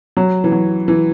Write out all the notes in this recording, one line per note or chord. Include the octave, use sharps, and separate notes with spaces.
F#3
E3
F#3
E3